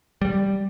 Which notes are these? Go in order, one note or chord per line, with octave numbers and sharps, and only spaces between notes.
G3